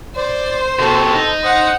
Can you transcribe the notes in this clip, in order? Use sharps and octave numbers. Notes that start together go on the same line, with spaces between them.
C5 D5
C3 F#4 A4
D#4
C5 F#5 D#6